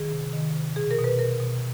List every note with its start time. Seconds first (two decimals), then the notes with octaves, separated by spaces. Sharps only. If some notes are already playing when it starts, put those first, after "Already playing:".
Already playing: D#3 G#4
0.12 C3
0.33 D#3
0.55 C3
0.76 B2 G#4
0.91 A#4
0.98 B2
1.04 B4
1.19 B2 A#4
1.40 B2